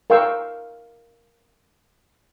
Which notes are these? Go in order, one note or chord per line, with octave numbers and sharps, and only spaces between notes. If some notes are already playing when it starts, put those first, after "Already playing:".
A#4 F5 G5 C#6 E6